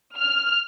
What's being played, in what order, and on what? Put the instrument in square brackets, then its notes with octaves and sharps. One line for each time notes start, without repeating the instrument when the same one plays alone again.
[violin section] F6